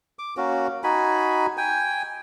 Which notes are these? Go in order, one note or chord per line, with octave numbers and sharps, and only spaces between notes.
D6
A#3 C#4 F#4
D#4 F#4 G#5 B5
G5 G#5